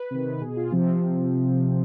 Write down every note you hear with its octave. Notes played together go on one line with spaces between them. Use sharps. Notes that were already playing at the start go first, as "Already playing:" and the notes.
Already playing: B4
C3 D#3
B4
B2 G#4
F4
C3 F3 C4